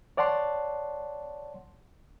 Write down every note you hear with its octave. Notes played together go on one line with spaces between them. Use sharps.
C#5 D5 F#5 A5 C6